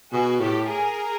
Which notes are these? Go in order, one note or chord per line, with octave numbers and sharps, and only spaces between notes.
B2 F#4 G#4
A2 G4 A4
G#4 A#4